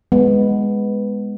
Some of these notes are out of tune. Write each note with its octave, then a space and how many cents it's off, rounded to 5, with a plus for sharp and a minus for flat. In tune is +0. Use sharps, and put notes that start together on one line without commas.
G#3 +0 B3 +0